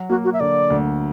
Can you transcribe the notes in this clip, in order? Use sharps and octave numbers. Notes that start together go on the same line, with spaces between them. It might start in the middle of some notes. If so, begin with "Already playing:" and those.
Already playing: F#3
A#3 F#4
F#4
E5
D3 D5
D2